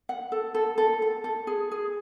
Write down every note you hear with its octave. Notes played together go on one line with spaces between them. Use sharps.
F#5
A4
A4
A4
A4
A4
G#4
G#4